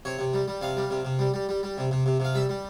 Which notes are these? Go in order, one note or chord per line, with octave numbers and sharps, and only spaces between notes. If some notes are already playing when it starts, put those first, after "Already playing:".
C3 C#5
C3
G3
G3
C3 F5
G3
C3
C3
G3
G3
G3
G3
C3
C3
C3
C3 F5
G3 E5
G3